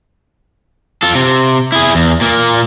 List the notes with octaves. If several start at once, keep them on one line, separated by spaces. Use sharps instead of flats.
F4 A4
C3
E4 G#4
E2
A#2 A#3